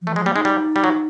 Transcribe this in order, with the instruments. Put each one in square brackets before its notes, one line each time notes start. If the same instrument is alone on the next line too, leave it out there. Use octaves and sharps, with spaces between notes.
[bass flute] F3
[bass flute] E3 [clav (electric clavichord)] A3
[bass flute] F3 [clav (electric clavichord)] G#3
[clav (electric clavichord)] G3 [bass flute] A#3
[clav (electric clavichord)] G#3 [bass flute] D#4
[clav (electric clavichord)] G3
G3
F#3